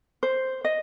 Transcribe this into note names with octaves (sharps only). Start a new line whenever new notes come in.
C5
D#5